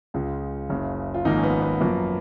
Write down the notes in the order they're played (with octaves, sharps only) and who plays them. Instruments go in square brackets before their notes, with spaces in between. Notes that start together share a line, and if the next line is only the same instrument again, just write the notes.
[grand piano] C#2 C#3 G#3 F4
F#1 F#2 C#3
F4
G#1 G#2 F3 A#3 D#4
C#4
B3
B3
F#2 F3 A#3